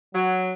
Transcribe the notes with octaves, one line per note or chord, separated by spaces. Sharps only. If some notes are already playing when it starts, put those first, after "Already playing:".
F#3